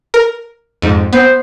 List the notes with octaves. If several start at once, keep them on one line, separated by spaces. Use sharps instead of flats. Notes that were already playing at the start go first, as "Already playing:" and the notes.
A#4
F2 G#2
B3 C5